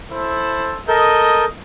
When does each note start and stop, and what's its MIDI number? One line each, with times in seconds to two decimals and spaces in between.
0.11 0.79 64
0.11 0.79 69
0.11 0.79 72
0.88 1.45 69
0.88 1.45 70
0.88 1.44 75
0.88 1.45 91